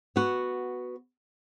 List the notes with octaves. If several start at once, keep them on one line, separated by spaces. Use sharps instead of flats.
B3 F#4